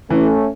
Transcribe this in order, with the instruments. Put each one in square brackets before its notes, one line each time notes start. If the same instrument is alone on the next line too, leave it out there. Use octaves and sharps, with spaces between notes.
[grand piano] E3 [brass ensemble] A3 C#4